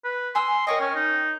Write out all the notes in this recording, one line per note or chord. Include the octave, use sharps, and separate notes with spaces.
B4
G#5 C6 D#6 E6
A#4 C#5 D#5 G5
C#4
D#4